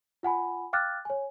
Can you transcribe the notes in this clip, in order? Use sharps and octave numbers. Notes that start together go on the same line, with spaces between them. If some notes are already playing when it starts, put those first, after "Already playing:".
F4 F#5 G#5 B5
F5 G5 D6 F6 F#6 A6
C#5 G#5